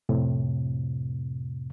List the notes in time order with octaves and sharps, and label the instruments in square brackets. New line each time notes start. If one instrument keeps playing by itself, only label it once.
[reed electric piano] F2 A2 C3